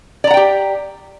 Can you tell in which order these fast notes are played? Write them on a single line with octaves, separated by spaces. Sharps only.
D5 A#5 F#5 G5 G4